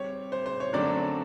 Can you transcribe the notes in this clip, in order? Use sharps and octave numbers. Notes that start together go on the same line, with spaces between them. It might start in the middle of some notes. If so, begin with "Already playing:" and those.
Already playing: G3 C4 C#5
C5
C5
C#5
F#2 D3 F#3 A3 C4 D5